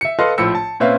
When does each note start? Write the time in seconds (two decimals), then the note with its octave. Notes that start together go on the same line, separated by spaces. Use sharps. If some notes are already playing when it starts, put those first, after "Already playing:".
0.01 E5 C#7
0.19 A4 B4 D#5 F5 C6 F6
0.38 A#1 A2 F3 E6 C#7
0.55 A5
0.80 A#2 C4 C#4 B4 E5 F5